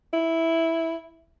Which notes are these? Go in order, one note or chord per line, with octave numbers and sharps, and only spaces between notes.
E4